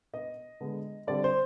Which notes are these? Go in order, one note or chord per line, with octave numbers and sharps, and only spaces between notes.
B2 B3 D#5
D3 G#3 B3
D3 G3 C4 D5
C5